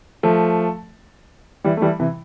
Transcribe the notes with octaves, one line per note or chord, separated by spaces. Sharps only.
F3 A3
E3 G3
A3
E3 G3
C3 E3